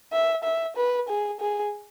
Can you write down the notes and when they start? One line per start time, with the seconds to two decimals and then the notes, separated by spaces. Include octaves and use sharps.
0.13 E5
0.44 E5
0.76 B4
1.08 G#4
1.40 G#4